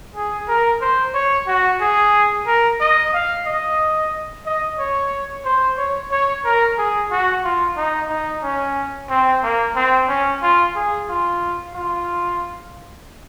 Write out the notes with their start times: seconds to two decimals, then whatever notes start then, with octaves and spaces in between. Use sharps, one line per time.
0.15 G#4
0.48 A#4
0.81 C5
1.14 C#5
1.47 F#4
1.81 G#4
2.47 A#4
2.80 D#5
3.14 F5
3.46 D#5
4.46 D#5
4.79 C#5
5.45 C5
5.78 C#5
6.12 C#5
6.44 A#4
6.78 G#4
7.11 F#4
7.44 F4
7.77 D#4
8.10 D#4
8.43 C#4
9.10 C4
9.43 A#3
9.76 C4
10.09 C#4
10.43 F4
10.76 G#4
11.09 F4
11.75 F4